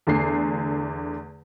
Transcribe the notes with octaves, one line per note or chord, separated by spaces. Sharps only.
E2 D3 A3 C7